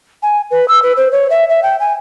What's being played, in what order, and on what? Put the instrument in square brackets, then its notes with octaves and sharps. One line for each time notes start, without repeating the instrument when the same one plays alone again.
[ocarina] G#5
B4
E6
B4
C5
C#5
E5
E5
G5
G#5